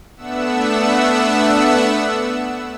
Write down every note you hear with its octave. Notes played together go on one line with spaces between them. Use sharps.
A3 B3 D4 E5 F#5 E6